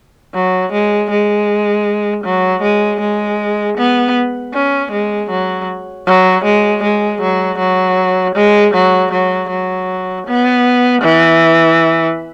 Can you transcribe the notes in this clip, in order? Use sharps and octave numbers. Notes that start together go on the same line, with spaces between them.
F#3
G#3
G#3
F#3
G#3
G#3
B3
C#4
G#3
F#3
F#3
G#3
G#3
F#3
F#3
G#3
F#3
F#3
F#3
B3
E3